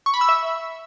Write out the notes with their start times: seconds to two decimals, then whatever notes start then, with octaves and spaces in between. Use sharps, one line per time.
0.06 C#6
0.14 B5
0.21 E6
0.29 E5